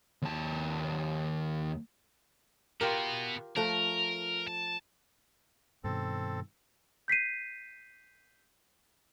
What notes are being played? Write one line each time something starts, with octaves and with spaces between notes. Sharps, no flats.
D#2 A5
B2 B3 F4 G4 A#4
F3 A3 A#4
A5
G2 B2 D#3 C4 A4
G6 B6 C7 D#7